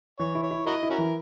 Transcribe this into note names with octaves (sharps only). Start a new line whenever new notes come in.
E3 C#5
E4
C#5
E4
E4 F#4 A#4 D#5
E4
C#4 F#4 A#4
E3